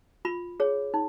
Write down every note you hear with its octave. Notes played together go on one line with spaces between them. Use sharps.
F4 B5
G#4 C#5
D#4